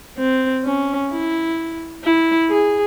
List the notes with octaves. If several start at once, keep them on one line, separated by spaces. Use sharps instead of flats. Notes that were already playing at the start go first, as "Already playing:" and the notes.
C4
C#4
E4
E4
G#4